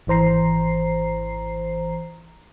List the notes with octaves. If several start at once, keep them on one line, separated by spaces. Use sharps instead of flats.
G#1 E3 C5 A#5 C7